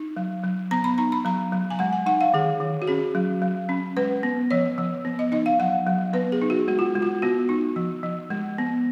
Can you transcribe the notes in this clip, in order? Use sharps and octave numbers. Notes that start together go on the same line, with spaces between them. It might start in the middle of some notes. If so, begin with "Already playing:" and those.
Already playing: D#4
F#3
F#3
B3 A#5
B5
D#4 A#5
B5
F#3 A#5
F#3
G#5
G#3 F#5
G#5
D#4 F#5
F5
D#3 G#4
D#3
F#4
C#4 G#4
F#3
F#3
C#4
G#3 B4
B3
F3 C#5
F3
B3
D#5
D#4 D#5
F5
F#3 F#5
F#3
B3 B4
G#4
D#4
F#4
G#3 F#4
F4
G#3
F4
B3 F#4
D#4
F3
F3
G#3
B3